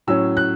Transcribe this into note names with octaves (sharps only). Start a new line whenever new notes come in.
A2 F#3 C#4 E6
F#6